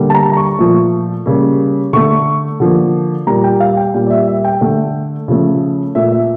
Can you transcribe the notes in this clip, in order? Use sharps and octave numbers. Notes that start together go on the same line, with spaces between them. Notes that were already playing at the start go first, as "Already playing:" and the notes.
Already playing: D3 G3 A#3
A5
A#5
A#5
C#6
A#2 F3 A3
C#3 G3 A#3
D3 A3 C#6
D3 F3 A#3
A#2 G3 A#3 A#5
G5
F5
G5
A#2 G3 A#3 G5
D5
E5
E5
G5
D3 A3
C#3 F3 A3
A#2 A3 E5
E5